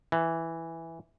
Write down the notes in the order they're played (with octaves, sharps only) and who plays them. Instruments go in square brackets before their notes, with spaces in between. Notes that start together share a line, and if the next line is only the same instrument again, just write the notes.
[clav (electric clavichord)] E3